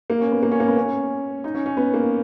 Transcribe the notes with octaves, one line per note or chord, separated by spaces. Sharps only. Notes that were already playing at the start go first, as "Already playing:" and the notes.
A#3
C#4
B3
A#3
C#4
A#3
B3
C#4
D#4
C#4
C#4
B3
A#3